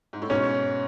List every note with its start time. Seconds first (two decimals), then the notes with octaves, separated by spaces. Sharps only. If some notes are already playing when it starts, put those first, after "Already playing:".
0.13 G#2
0.22 A2
0.30 G#2 B2 C#4